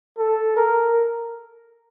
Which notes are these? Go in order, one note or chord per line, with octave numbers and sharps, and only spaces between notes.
A4
A#4